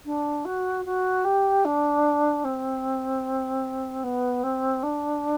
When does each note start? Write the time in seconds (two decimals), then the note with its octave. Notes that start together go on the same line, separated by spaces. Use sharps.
0.05 D4
0.45 F#4
0.85 F#4
1.24 G4
1.65 D4
2.44 C4
4.03 B3
4.43 C4
4.83 D4